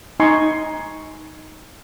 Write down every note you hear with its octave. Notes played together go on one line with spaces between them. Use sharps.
D#4 G#5 C6 C#6